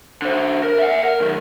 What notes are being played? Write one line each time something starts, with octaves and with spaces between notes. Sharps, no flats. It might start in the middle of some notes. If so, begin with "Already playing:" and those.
D3 C5
A#4
E5 F#5
A#4
B1 D#3